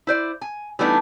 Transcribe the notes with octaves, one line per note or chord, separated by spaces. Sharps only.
E4 C5 D5
G#5
E3 G3 A3 B3 D4 D#4